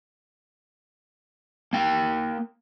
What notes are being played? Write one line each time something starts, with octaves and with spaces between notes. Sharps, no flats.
A#3 G5